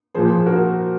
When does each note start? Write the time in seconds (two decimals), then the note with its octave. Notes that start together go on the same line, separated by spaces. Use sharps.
0.15 A#2 F3 G#4 C5
0.46 F#4 A#4